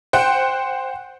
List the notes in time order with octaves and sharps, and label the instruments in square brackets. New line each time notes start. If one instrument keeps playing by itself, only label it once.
[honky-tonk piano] C5 F#5 G5